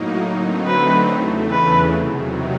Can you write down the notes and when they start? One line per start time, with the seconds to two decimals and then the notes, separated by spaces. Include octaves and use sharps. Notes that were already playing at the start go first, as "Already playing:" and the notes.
Already playing: A2 F#3 A#3 D#4
0.25 D3 F#3 A3 C4 D#4
0.67 B4
1.09 E2 C#3 E3 A3
1.50 B4
1.92 C3 D#3 F#3